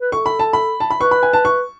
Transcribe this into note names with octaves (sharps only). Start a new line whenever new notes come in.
B4
A4 C#6
B5
A5
B5
A5
B5
B4 C#6
B5
G#5
A5
C#6